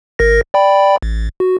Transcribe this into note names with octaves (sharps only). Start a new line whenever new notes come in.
G#1 A#4 A#6
D5 G5 B5
A1
F#4